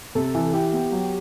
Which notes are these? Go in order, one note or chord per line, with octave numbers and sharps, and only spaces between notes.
C3 A4
E3
E4 G4
B3
F#3